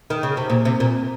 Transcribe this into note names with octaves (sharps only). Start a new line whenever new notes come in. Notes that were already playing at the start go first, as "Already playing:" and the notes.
D#3
C#3
C3
A#2
C3
A#2